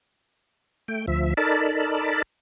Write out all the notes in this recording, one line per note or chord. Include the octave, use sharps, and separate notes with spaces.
A3 G5
D2 F3 E5
D#4 A4 A#4 D5 A5 B5